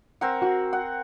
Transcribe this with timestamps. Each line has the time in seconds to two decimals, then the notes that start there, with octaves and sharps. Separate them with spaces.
0.21 C4 A#4 F#5
0.42 F#4
0.73 F#5